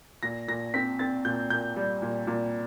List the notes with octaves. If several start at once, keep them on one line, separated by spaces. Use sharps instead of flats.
A#2 A#6
A#2 A#6
C4 B6
C4 A6
A#2 G6
A#2 G6
G3
A#2
A#2